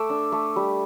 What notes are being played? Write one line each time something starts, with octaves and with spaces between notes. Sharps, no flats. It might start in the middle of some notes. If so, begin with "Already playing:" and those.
Already playing: A3 D6 E6
D4
A3
G3